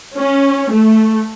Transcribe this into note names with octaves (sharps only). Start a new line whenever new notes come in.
C#4
A3